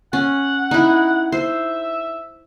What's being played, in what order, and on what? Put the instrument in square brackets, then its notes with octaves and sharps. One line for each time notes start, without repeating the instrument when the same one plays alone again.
[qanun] C#4 [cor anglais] F#5
[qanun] D#4 E4
[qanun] C5 [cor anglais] E5